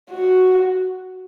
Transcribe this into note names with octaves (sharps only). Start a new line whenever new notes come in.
F#4